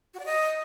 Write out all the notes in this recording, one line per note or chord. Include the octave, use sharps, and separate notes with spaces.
F#4
D5
D#5